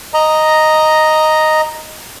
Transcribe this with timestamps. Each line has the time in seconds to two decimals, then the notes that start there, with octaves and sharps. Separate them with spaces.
0.14 D#5 A#5